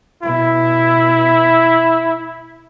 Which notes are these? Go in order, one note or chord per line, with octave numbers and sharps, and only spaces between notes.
B2 E4